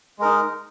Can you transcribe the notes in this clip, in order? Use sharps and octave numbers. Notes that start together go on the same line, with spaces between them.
G#3 D#4 A#4